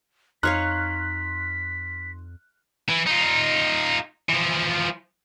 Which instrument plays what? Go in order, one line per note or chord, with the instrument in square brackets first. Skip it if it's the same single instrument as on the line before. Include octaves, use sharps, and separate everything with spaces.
[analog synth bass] F2 [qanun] D#4 C#5 F5 [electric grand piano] C6 F6 F#6 [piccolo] B6
[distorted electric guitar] E3
D#4 F4
E3 F3